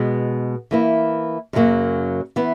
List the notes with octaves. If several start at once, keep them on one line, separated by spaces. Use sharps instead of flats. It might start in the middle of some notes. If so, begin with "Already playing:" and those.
Already playing: B2 G#3 B3
E3 A#3 E4
F#2 C#3 F#3 A#3
E3 B3 E4